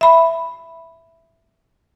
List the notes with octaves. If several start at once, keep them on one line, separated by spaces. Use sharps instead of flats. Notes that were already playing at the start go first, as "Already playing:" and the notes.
E5 B5